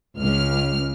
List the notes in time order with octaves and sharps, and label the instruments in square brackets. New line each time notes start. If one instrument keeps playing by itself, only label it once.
[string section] C#2 F6